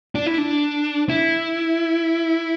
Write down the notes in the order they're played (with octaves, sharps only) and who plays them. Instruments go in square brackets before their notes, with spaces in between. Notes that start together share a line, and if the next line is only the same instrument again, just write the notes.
[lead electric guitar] D4
E4
D4
E4